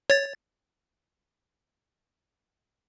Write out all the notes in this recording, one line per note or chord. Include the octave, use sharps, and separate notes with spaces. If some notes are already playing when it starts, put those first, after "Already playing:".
C#5 A6